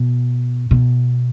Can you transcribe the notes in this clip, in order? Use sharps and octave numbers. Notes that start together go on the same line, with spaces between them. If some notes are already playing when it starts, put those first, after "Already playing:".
Already playing: B2
B2